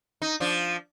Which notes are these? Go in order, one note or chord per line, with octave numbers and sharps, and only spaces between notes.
D#4
F3 D4